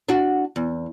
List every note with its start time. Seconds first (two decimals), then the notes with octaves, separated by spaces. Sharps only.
0.09 D4 F#4
0.56 E2